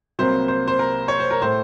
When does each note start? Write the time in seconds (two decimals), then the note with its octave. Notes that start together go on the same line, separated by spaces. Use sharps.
0.19 C2 C3 F#3 A#3 C5
0.48 C5
0.68 C5
0.79 A#4
1.08 C#5
1.19 C5
1.31 A#4
1.41 A2 A3 C5